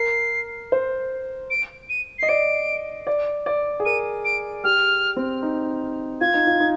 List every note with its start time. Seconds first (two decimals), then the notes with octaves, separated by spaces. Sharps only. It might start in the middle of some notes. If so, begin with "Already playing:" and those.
Already playing: A#4 C7
0.72 C5
1.50 D7
1.89 D#7
2.18 D#5 C7
2.29 D5 D7
3.07 D5
3.46 D5
3.80 G#4
3.85 A#4 D#7
4.25 D7
4.64 G4 F6
5.16 C4
5.42 D#4
6.21 F4 G#6
6.34 D#4
6.47 F4
6.60 D#4